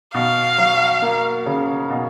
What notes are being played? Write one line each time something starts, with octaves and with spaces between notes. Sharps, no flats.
B2 F5
F#3
A#3
C#3
B2